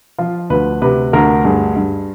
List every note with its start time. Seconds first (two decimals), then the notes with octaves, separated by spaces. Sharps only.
0.18 F3 F4
0.50 D2 B4
0.82 C3 B4
1.13 D2 A#4
1.45 G2 G#4
1.76 G2